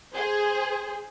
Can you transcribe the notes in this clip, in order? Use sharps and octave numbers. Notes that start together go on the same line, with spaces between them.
G#4 C5